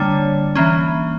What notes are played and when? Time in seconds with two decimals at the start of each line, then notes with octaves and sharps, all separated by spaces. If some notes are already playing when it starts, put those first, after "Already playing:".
Already playing: D3 G3 A#3 D4 C#5
0.55 E3 A#3 C#4